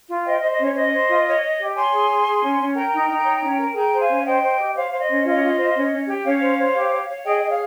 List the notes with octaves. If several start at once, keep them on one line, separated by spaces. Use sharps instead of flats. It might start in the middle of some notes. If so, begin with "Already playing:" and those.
F4
C5 D#5 G5
D#5
C5
D#5
C#4 C#5
C5 D#5
C5
F4
C#5
C#5
G4
C#5 G#5 C6
G#4
G#4
G#4
C#4
C#4
A#4 G5 A#5
D#4
D#4
C#5
C#4
A#4
G#4 G5 A#5
C5
F5 G#5
C#4
F5
C5 D#5 G5
C5
G4
C5 C#5 F5
C5 F5
D#5
C#4
F4 D#5
F4
C5
C#4
C#4
G4
C#4 C#5 F5
C5
C5
G4
C#5
C#5
G#4 D#5 G5
G#4 D#5
C#5 F5